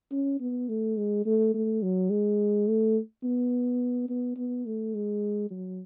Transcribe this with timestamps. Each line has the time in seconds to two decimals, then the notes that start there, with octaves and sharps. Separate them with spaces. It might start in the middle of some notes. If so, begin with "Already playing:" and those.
0.12 C#4
0.40 B3
0.69 A3
0.97 G#3
1.26 A3
1.54 A3
1.83 F#3
2.10 G#3
2.68 A3
3.24 B3
4.09 B3
4.37 B3
4.66 A3
4.94 G#3
5.51 F#3